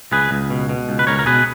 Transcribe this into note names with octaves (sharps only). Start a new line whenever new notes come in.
C#2 G#4 B4
C#2
B2
B2
C#2
B4
C#2 A#4 C#5
A#4
B2 G#4 B4